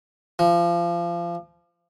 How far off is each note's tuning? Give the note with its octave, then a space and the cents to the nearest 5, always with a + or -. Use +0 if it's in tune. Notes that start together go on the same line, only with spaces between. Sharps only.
F3 -25